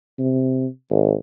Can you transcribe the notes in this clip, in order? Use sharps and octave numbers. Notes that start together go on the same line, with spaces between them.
C3
G#1